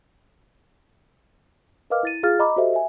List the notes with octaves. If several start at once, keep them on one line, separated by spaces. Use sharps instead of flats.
A#4 B4 D#5 F5 D6 F6
E4 A6 D#7
F4 G#4 F5 F6 A6
D#5 A#5 B5 D6
F#4 G4 A4 C5 D#5 E5
E5 G#5